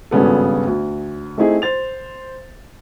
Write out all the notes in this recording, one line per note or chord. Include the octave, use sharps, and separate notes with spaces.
G#1 G2 C#3 B3 A4
D2
A3 C4 D#4 E4 G#4
C5 A6 F7